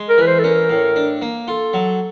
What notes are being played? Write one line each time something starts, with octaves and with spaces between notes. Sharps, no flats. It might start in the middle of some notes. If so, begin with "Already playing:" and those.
Already playing: G#3
A#4
E3 B4
C5
A4
C#4 A#4
A2
D4
A#3
F4 A4
F#3